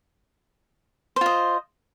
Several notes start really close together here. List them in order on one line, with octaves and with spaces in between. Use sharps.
C5 F4 D#5